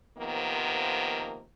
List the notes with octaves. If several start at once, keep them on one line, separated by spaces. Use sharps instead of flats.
C3 D#3 F3 A#3 B3